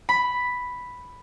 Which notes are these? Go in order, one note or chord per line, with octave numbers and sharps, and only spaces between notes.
B5